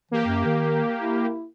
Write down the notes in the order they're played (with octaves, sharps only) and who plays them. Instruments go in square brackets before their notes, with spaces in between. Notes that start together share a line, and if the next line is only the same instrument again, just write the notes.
[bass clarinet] E3 [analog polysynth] A#3 G4
[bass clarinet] F#2
D#3
E4